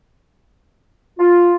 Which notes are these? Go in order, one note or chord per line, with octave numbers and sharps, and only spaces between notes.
F4